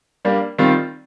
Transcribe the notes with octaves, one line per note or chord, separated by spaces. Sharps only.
G3 A#3 D4
D#3 G3 C4 F4